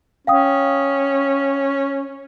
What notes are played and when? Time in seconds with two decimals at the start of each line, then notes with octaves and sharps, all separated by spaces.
0.27 C#4 F5 G5 D#6